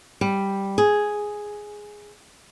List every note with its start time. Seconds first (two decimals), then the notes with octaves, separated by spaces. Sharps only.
0.21 G3
0.78 G#4